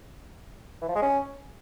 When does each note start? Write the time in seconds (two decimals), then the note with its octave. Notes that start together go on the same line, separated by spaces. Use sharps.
0.82 E3
0.88 F3
0.95 G#3
1.02 C#4